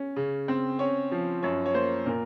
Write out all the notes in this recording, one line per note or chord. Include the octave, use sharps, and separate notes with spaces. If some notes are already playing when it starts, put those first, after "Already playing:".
Already playing: C#4
C#3
C4
C#4 C#5
F3
F#2 C#5
C#5
A#3 C5
A#2 A#4